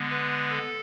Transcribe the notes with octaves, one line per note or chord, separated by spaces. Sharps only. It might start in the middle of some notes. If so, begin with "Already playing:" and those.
Already playing: D3 G#3 B3
B4
A4